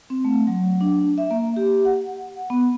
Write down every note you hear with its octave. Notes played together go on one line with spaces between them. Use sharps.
C4
A3
F#3
D4
E5
A#3
G4
F#5
B3